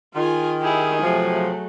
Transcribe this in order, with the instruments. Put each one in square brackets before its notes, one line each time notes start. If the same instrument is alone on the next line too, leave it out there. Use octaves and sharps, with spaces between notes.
[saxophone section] D#3 [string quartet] F4 G#4 G#5
[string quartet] E4 G4 [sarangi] G#4
[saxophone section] C3 F3 [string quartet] F#3 A3